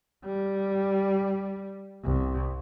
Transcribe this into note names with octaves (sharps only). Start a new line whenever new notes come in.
G3
C2